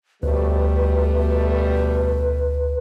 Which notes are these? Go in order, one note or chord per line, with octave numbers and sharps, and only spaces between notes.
D2 B2 G3 A3 B4